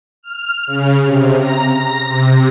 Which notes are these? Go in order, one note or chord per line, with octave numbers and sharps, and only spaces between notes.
F6
C#3
C3
A#5
A#6
C3